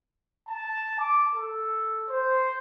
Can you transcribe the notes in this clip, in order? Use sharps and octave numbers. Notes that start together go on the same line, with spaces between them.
A5
D6
A4
C5